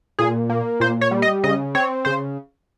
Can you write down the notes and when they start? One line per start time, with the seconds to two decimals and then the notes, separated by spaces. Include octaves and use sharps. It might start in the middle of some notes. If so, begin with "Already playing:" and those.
0.19 A#2 G#4
0.50 A#3
0.80 A#2 C5
1.01 C#5
1.11 G3
1.22 D#5
1.44 C#3 D#5
1.75 C4 C#5
2.05 C#3 C5